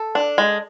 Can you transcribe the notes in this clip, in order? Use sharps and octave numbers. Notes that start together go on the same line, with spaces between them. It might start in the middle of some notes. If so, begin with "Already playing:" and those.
Already playing: A4
D4
G#3